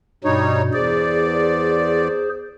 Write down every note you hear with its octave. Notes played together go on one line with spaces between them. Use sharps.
G2 B2 G3 D#4 C#5
E2 G#4 C5 D5